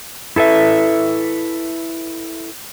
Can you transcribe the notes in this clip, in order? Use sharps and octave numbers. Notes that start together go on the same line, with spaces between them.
E4 A4 B4 E5